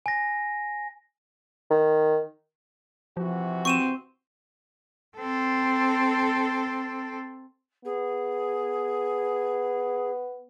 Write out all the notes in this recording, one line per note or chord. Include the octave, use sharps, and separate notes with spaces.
G#5 A#6
D#3
C3 E3 F3 F#4
C4 C#6 D#7 E7
C4 A4
B3 G#4